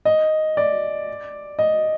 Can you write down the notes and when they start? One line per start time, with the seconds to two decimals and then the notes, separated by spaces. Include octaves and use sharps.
0.05 D#5
0.57 D5
1.59 D#5